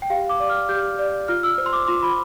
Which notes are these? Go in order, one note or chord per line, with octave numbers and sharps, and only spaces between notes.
G5
G4 F5
D6
D5
F6
G4 G6
D5
F4 F6
E6
C5
C6
D6
F4 C6
B5